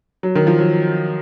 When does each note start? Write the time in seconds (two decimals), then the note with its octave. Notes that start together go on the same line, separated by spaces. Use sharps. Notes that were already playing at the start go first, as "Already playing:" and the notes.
0.23 F#3
0.35 D#3
0.47 F3
0.59 F#3